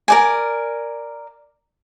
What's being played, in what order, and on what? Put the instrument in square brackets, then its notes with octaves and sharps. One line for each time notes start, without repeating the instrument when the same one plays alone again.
[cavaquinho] A#4 D5 G#5